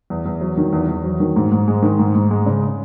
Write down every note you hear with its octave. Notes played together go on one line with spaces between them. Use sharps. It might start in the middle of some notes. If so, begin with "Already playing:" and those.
E2
E2
F#3
D#3
E2
E2
F#3
D#3
G#2
G#2
G#3
D#3
G#2
G#2
G#3
C#3